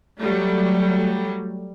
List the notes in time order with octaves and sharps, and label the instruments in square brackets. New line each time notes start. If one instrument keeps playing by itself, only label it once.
[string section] F#3 G3 A3